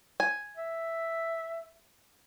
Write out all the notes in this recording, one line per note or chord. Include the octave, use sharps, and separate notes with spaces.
G#5
E5